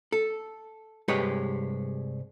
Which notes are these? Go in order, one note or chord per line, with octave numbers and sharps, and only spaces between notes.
A4
C2 G2 G#3 G4 B4 C#5